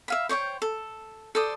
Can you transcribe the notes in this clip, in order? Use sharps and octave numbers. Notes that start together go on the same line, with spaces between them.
E5 F5 B5
C5 C#5 D#5 G5
A4
A4 C5 D5 D#6